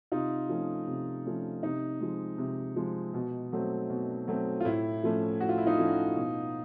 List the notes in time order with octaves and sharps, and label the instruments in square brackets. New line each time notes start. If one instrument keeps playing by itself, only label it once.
[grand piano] C3 D#4 F4
F3 A3 C#4
C3
F3 A3 C#4
C3 D#4
F3 G#3
C3
F3 G#3
B2
F#3 A3 C4
B2
F#3 A3 C4
F4
A2 E4
F3 A3 C#4
A2 F#4
F4
E4
D#4 F4
F3 A3 C#4
B2